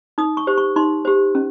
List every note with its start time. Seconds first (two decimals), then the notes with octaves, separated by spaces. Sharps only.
0.18 D#4 D#6
0.37 C#6
0.47 G4 C5
0.58 C#6
0.76 D#4 C6
1.05 G4 C5
1.35 C#4